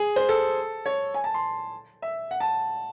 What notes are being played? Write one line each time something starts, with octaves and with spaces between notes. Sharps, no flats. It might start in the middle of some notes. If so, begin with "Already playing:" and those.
Already playing: G#4
C5
A4
C#5
G#5
A5
C6
E5
F#5
A5